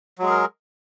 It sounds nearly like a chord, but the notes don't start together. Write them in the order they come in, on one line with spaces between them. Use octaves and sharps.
F#3 G#3 G#4 A#4